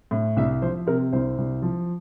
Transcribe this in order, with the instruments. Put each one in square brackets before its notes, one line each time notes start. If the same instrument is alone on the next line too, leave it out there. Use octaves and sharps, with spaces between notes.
[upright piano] A2
C2 E5
F3 C5
C3 A#4
C2 C5
C2
F3